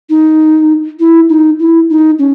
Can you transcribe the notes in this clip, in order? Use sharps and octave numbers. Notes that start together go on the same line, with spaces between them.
D#4
E4
D#4
E4
D#4
C#4